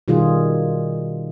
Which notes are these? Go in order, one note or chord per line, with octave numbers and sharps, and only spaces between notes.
B2 D#3 G3 F4 G#4